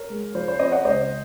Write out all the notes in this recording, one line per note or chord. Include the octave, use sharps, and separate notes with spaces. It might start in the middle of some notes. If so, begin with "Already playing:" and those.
Already playing: A#4 C#5
G#3
F3 C5
C5
C4 C5 D#5
D#5 F#5
C#2 C5 D#5